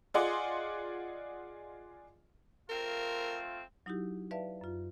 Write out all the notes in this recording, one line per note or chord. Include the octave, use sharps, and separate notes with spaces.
F4 G#4 D5 D#5 F#5 C6
A3 C4 F4 A#4
F#3 D#4 E4 F#4 G4
B4 D5 E5 F5 A5
F#2 F4